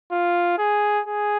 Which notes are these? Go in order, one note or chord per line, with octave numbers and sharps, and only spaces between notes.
F4
G#4
G#4